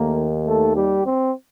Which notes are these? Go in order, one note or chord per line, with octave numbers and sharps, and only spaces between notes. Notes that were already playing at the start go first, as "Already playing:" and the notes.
Already playing: D#2 D#3 A3 A#3 A#4
A3 A4
G3 G4
C4